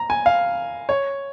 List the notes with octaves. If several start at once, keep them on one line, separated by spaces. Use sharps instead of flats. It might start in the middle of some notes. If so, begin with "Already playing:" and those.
Already playing: A#5
G#5
F5
C#5